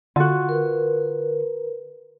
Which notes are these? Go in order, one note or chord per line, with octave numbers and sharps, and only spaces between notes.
D3 F4 F#4
A#4 B4